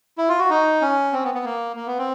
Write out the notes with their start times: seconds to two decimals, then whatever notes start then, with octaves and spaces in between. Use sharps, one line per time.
0.18 E4
0.29 F4
0.39 F#4
0.50 D#4
0.82 C#4
1.13 C4
1.24 B3
1.34 B3
1.45 A#3
1.76 A#3
1.87 B3
1.98 C4